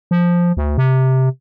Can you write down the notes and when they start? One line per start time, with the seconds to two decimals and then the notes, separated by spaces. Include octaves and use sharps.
0.11 F3
0.57 D2
0.78 C3